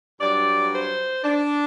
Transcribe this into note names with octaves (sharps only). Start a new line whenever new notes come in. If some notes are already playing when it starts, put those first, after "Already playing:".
G2 F#3 D5
C5
D4